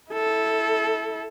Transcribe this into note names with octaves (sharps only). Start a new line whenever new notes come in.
E4 A4